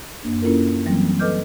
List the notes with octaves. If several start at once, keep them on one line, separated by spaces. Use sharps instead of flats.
F#2 A#3 D4
A#3 C#4 E4 F4 A4 A#4
E3 F#3 G3 A#3 C4
A4 B4 D#5 D6 F6 G6